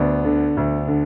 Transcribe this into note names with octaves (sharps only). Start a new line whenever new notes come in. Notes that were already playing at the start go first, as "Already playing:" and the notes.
Already playing: D2 B3 D4
D3
D2
D3